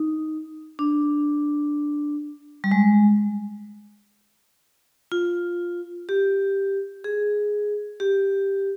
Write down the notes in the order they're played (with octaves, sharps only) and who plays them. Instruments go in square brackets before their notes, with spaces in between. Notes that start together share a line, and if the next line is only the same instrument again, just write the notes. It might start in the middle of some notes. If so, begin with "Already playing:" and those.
Already playing: [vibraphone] D#4
D4
G3
G#3
F4
G4
G#4
G4